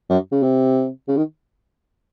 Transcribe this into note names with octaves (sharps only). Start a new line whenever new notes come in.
F#2
C#3
C3
C#3
D#3